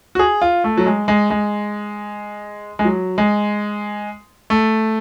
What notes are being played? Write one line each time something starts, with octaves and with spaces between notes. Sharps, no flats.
F#4
G#4
F4
A3
F#3
G#3
G#3
G#3
G#3
F#3
G#3
A3